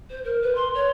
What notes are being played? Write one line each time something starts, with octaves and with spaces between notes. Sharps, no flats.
C5
A#4
B4
C6
C#5